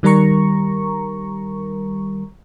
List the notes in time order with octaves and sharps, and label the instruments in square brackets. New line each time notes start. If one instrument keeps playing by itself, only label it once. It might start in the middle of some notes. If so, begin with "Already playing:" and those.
[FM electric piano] D#3 G3 A#4 A#5 C#6